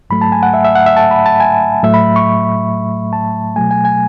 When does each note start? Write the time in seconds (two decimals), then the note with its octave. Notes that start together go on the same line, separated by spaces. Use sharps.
0.10 G#2 F#3 A3 B5
0.21 A5
0.32 G#5
0.43 F#5
0.54 E5
0.64 E5
0.75 F#5
0.86 E5
0.97 A5
1.11 B5
1.26 A5
1.40 G#5
1.83 A2 F#3 A3 E5
1.94 B5
2.16 C#6
3.13 A5
3.56 B2 F#3 A3 G#5
3.71 G#5
3.85 G#5